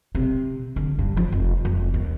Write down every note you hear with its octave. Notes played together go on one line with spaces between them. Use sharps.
C3
D3
G2
F3
F1
F1
D#2